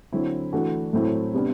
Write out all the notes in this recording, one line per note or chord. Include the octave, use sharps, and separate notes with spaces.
D3 F#3 C4 E4
E3 A3 D4 F#4
A2 F#3 A3 C4 E4
C3 G3 B3 D4